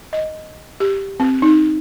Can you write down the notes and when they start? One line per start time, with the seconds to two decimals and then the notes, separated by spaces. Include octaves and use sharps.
0.13 D#5
0.80 G4
1.20 C4
1.42 D#4